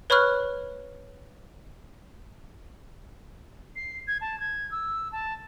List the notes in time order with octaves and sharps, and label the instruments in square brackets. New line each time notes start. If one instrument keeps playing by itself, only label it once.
[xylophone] B4 C#5 B5 C#6 F6 F#6
[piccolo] C7
G#6
A5
G#6
E6
A5